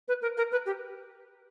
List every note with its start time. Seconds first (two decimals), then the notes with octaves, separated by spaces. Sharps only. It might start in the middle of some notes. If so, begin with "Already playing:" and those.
0.08 B4
0.22 A#4
0.37 A#4
0.52 B4
0.66 G4